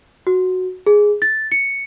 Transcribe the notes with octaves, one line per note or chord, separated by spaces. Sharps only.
F#4
G#4
A6
C#7